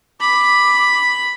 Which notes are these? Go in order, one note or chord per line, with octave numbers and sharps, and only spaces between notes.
B5 D6